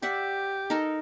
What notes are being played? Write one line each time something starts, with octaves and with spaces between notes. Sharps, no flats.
G4 D5 E5 F#5
D#4 A4 A#4